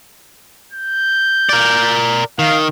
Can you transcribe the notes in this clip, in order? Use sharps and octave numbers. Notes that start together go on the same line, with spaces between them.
G6
A#4 D5
D#3 F5